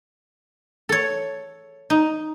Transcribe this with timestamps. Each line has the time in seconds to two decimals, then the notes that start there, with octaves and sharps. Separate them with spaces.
0.89 A4 C#5
1.90 D#4